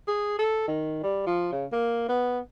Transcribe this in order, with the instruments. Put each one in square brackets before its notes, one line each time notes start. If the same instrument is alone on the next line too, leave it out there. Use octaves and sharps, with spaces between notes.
[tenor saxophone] G#4
A4
D#3
G3
F3
C#3
A#3
B3